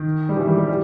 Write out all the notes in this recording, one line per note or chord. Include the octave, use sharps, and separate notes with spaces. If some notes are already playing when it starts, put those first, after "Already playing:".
Already playing: D#3
G3
E3
G3
G3
G3